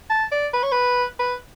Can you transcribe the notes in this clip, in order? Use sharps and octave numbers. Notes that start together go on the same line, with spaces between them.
A5
D5
B4
C#5
B4
B4